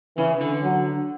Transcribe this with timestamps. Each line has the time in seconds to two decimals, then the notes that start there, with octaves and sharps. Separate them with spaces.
0.17 C#3 E3
0.41 D3
0.64 F#3